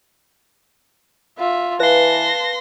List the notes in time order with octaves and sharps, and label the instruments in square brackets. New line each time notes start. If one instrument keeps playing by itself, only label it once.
[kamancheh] F4 E5
[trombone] E3 [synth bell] B4 F5 [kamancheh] A5 [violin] C6 A#6